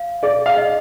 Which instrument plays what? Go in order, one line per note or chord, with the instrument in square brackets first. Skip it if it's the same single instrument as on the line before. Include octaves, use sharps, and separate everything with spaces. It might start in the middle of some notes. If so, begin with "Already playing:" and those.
Already playing: [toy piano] F5
[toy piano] G#4 [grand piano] D5
[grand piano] F5
[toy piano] D#5